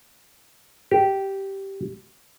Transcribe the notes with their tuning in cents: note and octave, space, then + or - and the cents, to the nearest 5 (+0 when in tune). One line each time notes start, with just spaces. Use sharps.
G4 -10